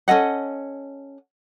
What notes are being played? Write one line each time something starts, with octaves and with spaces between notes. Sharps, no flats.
C#4 A4 D#5 F#5